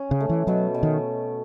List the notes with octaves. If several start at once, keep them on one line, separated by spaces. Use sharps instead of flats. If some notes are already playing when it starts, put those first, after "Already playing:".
Already playing: C#4
C#3
A3
E3
B2 F#3
B2
D#3